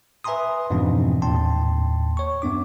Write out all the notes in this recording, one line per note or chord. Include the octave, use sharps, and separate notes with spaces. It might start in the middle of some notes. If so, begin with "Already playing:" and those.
B4 E5 G#5 A#5 C6 D#6
F2 G#2 B2 E3 C4 D4
D#2 A2 G5 A5 C6
C#5 C#6
F#2 B3 D4 D6